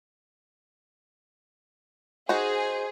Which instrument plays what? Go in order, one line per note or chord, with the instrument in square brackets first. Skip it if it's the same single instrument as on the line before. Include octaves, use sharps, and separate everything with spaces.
[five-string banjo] D#4 F#4 [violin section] G#4 [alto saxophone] C5